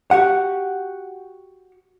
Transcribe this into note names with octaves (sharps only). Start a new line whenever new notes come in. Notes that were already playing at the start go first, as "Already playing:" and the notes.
F#4 G4 F#5